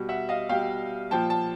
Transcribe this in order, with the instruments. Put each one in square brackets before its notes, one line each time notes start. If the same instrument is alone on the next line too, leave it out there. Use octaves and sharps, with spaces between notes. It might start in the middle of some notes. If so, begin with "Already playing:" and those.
Already playing: [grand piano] B2 G3
E5 F#5
D#5 F5
B2 G3 F5 G5
A#2 F3 G5 A5
A5